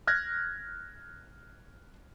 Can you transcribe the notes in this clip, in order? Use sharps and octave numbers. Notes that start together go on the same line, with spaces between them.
F6 F#6 G#6 A#6